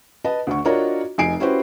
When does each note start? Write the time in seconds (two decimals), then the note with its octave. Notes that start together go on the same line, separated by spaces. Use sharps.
0.25 B4 D#5 A5
0.47 D2 D3 C#6
0.65 D4 F4 F#4 A#4 C#5 D#5
1.18 F1 D#4 G#5 C7 D7
1.40 C#4 E4 F#4 G4 B4 C5